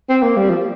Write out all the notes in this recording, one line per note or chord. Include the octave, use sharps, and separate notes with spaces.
C4
A#3
G3
F3